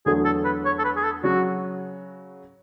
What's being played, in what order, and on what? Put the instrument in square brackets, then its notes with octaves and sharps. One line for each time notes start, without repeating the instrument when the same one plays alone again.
[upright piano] E2 D3 F#3 A3 [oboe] G#4
[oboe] A4
B4
C#5
A4
B4
G#4
A4
[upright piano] C#3 F#3 [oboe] F#4